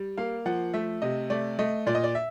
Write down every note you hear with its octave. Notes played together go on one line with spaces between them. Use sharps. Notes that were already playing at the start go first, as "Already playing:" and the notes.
Already playing: G3
A#3 F5
F3 F#5
A3 E5
C3 D#5
A3 D5
A3 D#5
A#2 D5
D#5
D5
E5